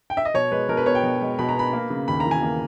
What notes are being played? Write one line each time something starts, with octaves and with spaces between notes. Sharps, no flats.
G5
E5
D#5
B2 C#5
G#3 B4
B2 A#4
B4
B3 C#5
G5
B2
G#3
B2 B5
A#5
B3 B5
A#3
C#3
D#2 B5
A#5
E3
G#5
A#3